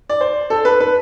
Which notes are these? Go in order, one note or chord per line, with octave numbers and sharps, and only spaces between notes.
D5
C5
A4
B4
B4